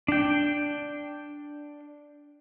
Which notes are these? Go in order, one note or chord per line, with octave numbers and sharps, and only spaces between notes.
D4 G5